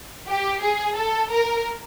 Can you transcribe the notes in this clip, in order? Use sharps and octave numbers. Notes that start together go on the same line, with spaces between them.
G4
G#4
A4
A#4